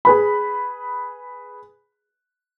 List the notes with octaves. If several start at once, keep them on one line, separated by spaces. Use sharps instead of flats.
G#4 B4 B5